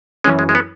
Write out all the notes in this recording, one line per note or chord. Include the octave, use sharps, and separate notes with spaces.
F#2 E3 G#3 C#4
G#3
G#3
B3